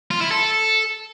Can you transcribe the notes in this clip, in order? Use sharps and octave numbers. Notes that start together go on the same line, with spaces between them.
F4
E4
A4